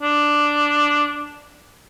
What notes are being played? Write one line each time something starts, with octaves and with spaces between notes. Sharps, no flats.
D4